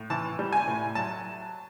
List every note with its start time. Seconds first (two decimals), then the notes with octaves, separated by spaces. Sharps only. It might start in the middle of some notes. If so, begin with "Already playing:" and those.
Already playing: A2
0.10 E3 A5
0.39 G3
0.53 G#5
0.67 A2
0.95 F#3 A5